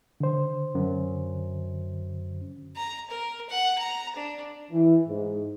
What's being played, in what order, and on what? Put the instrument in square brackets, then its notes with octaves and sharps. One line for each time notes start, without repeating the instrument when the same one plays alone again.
[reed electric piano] D3 C5
[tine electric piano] F#2
[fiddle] A#5
A#4
F#5
A#5
D4
[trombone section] E3
G#2